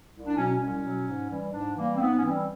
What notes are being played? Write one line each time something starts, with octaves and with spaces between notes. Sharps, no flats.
C2
D4
B2 F#3 C#4
C2 C#4
B2 F#3
G#2
E3 G3
G#2 D4
E3 G3 A#3
C4
G#2 B3
C#4
E3 G3 C4